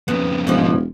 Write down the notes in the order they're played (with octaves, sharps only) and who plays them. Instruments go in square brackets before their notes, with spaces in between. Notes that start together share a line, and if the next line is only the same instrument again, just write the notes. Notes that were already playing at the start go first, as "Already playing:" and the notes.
[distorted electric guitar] F2 C#3 [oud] B3
[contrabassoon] E1 [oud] G#2 E3 F3